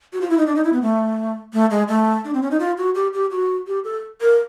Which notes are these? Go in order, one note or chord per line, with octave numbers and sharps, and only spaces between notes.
F#4
F4
E4
D#4
D4
D#4
E4
B3
A3
A3
G#3
A3
D4
C4
C#4
D#4
F4
F#4
G4
G4
F#4
G4
A4
A#4